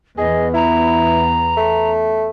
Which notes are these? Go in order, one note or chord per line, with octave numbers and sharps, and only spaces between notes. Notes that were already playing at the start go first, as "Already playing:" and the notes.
E2 B3 G#4 D#5
E4 A#5
A3